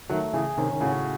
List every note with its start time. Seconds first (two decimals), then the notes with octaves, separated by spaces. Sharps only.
0.09 D#3 F#3 A3
0.33 C#3 E3 G#4
0.57 C3 D#3 C#4
0.71 D#3
0.80 A2 C#3 F#4